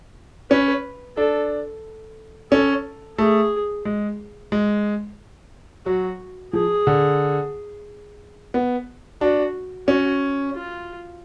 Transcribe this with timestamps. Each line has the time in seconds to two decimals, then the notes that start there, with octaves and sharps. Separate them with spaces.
0.51 C#4 B4
1.17 D4 A4
2.51 C#4 A4
3.18 A3 G#4
3.85 G#3
4.52 G#3
5.86 F#3 F#4
6.53 F3 G#4
6.87 D3
8.54 B3
9.21 D4 F#4
9.88 C#4 F#4
10.55 F4